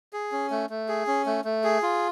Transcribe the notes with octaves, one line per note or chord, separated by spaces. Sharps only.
G#4
C#4
A3
A3
G#4
C#4
A3
A3
G#4
F4